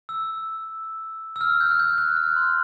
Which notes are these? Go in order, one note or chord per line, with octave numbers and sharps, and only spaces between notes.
E6
E6
F6
G6
F#6
G6
F#6
F6
C6